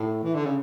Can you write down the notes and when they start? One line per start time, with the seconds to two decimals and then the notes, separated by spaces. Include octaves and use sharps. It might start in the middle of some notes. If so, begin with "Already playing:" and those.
Already playing: A2
0.23 E3
0.35 D3
0.45 C#3